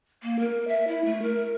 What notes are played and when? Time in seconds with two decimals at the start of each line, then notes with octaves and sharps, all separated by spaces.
0.23 A#3
0.39 A#4
0.68 E5
0.88 E4
1.05 A3
1.22 A#4